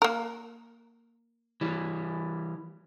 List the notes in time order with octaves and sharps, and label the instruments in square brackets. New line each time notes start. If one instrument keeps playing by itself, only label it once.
[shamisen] A#3 A#4
[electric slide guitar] E3 G3